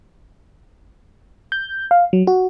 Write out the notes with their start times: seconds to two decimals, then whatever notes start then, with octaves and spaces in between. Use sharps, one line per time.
1.52 G6
1.91 F5
2.13 F#3
2.27 F#4